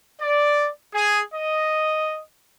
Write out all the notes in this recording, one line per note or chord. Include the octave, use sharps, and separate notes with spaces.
D5
G#4
D#5